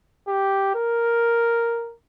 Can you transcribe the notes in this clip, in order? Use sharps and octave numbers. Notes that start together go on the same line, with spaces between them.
G4
A#4